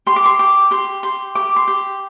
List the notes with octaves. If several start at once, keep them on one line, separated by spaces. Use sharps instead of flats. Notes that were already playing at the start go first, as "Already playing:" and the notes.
G4 C6
D6
C6
G4 D6
G4 C6
G4 C6
G4 D6
C6
G4